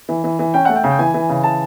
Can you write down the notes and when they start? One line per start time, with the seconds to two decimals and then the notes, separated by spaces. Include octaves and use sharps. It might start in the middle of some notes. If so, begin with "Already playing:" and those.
0.09 E3
0.24 E3
0.39 E3
0.54 C#4 G5
0.65 A3 F#5
0.76 G5
0.84 C#3
0.91 G5
0.99 E3 G#5
1.14 E3
1.29 C#3
1.43 E3 A5